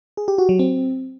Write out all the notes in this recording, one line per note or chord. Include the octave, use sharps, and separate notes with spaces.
G#4
G4
F#4
F#3
C4